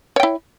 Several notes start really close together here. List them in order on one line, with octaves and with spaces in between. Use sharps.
C#5 G5 E4